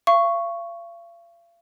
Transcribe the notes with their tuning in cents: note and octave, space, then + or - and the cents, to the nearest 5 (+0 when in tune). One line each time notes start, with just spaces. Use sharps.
F5 -40 C#6 +0